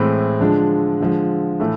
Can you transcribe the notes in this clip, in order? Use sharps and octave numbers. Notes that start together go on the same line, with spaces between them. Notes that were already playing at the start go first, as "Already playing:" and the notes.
Already playing: A2 E3 G#3 C4
D3 F3 G#3 D4
D3 F3 G#3
A2 E3 A3